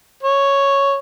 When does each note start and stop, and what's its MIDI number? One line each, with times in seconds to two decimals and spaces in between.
0.23 0.99 73